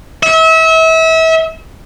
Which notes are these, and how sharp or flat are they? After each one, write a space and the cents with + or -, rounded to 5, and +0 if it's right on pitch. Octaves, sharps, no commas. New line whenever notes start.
E5 -35